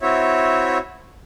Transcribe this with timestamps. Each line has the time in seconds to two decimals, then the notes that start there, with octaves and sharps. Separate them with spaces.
0.01 C4 E4 F#4 C#5 E5